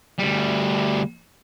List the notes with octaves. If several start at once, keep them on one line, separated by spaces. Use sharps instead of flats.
D2 G3